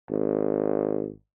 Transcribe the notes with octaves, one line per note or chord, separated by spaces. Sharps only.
G#1